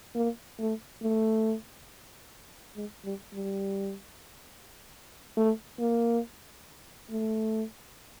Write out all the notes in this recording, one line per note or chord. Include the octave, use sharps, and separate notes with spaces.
A#3
A3
A3
G#3
G3
G3
A3
A#3
A3